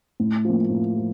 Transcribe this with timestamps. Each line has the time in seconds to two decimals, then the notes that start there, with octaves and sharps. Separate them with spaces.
0.20 A2
0.45 F3 A#3
0.70 A2
0.97 F3